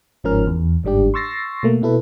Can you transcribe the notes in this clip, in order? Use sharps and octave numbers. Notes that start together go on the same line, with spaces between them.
G1 G#2 F3 C#4 A#4 F6
E2
G1 G#2 G3 D4 G4
C6 C#6 E6 A6 A#6 C7
B2 A3 A#3
B2 E4 A4 B4